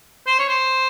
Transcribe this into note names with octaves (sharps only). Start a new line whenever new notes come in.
C5
C#5
C5